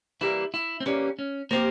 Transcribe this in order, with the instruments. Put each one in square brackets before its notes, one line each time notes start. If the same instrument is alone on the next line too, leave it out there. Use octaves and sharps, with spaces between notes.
[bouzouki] E3 G3 A#3 [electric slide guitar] E4
[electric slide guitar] E4
C4
[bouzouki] E3 G3 A#3 [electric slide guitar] C#4
[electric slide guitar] C#4
[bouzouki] F3 C4 G4 [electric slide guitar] A#3